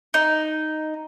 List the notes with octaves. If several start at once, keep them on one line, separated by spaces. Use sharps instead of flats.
D#4